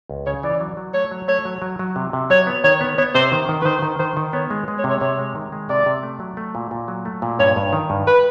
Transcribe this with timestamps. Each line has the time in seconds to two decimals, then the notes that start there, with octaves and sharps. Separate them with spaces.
0.09 C#2
0.26 C#3 C#5
0.44 E3 D5
0.60 F#3
0.77 F#3
0.94 A3 C#5
1.11 F#3
1.28 A3 C#5
1.45 F#3
1.62 F#3
1.79 F#3
1.96 C3
2.13 C3
2.30 F#3 C#5
2.47 B3
2.64 D#3 C#5
2.81 B3
2.98 B3 C#5
3.15 C3 C5
3.32 D#3
3.49 D#3
3.61 B4
3.65 D#3 C5
3.82 D#3
3.99 D#3 C5
4.17 D#3
4.33 B3 C#5
4.51 G#3
4.68 G#3
4.79 C#5
4.84 C3
4.90 C#5
5.01 C3 C#5
5.19 G#3
5.35 D#3
5.52 G#3
5.69 C3 D5
5.86 C3
6.03 A3
6.20 F#3
6.37 A3
6.55 A#2
6.71 A#2
6.88 F#3
7.05 A3
7.22 A#2
7.39 G2 C#5
7.56 G2
7.73 D#3
7.90 G2
8.07 B4